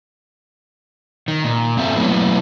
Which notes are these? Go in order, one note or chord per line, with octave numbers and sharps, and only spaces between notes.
D#3
A#2
G2 C4 A4 E5
A2 E3 F#3 A#3 B3